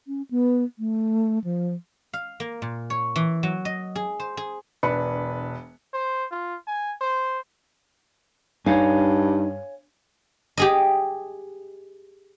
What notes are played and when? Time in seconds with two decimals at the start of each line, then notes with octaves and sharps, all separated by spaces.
0.07 C#4
0.31 B3
0.79 A3
1.44 F3
2.14 F5
2.40 A#3
2.62 A#2
2.90 C#5
3.16 E3
3.43 F#3
3.65 D#5
3.96 G#4
4.20 C5
4.37 G#4
4.83 E1 D4 B4 C#7
5.94 C5
6.31 F4
6.67 G#5
7.01 C5
8.66 G2 D#4 C#5 F5 G#5
10.57 G4 G#4 D#5